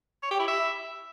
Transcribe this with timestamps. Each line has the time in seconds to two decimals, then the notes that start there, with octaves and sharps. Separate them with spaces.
0.23 C#5
0.31 G4
0.40 E4
0.48 E5